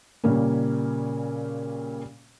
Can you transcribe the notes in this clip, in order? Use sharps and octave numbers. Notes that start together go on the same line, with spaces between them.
A#2 C#3 G3 A#3 C#4